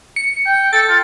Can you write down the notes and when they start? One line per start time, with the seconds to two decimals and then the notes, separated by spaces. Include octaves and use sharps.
0.16 C#7
0.46 G5
0.73 A4 A6
0.89 F4